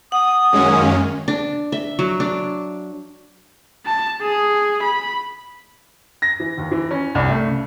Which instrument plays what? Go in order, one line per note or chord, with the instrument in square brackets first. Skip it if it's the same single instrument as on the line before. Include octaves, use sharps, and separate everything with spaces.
[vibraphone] F#5 [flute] D#6
[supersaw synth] F#2 G#3 C#4 [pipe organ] D#3 A#3
[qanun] D4
E5
F#3
D4
[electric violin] A5
G#4
B5
[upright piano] A#6
E3
D#2
E3
C#4
C2
A3
C#3